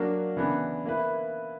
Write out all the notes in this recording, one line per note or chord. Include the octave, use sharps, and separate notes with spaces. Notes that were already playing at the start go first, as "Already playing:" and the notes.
Already playing: F#3 A#3 D4 F#4 A#4
C#3 E3 B3 D4
A#3 E4 B4